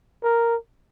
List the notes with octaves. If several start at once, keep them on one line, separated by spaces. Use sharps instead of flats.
A#4